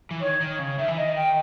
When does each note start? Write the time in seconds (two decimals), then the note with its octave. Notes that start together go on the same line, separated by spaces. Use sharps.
0.11 E3
0.21 D#3 C#5
0.41 D#3
0.59 C#3
0.78 D#3 E5
0.88 E3
0.97 D#3 D#5
1.16 G5